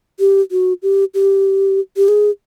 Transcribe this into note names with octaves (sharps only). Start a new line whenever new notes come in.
G4
F#4
G4
G4
G4
G#4